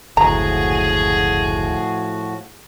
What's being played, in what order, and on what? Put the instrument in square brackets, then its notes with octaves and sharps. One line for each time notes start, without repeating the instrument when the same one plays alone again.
[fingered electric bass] F#1 D2 [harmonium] A2 F3 F#4 [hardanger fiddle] G#4 [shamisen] A#5